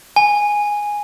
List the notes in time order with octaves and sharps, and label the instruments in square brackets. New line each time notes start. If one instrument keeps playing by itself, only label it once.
[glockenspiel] G#5